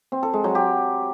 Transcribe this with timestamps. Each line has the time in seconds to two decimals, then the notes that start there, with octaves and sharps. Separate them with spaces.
0.12 C4
0.23 A4
0.33 G#3
0.44 F#3
0.55 G4